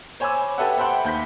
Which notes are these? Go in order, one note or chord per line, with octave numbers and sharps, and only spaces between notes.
C5 C#5 G#5 B5 D6 E6
G4 A4 B4 E5 F#5
C5 E5 F#5 G5 B5 C6
D#2 G6 B6